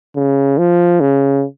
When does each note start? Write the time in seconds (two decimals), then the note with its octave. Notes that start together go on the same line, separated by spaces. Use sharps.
0.16 C#3
0.58 F3
1.00 C#3